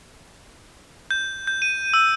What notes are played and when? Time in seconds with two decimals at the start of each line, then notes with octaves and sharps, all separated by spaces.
1.11 G6
1.47 G6
1.62 D#7
1.94 E6